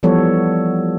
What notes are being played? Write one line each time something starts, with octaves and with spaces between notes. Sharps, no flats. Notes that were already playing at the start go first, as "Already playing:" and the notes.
E3 F3 G3 B3 A4 C#5